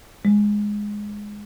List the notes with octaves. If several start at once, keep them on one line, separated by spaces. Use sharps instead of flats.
G#3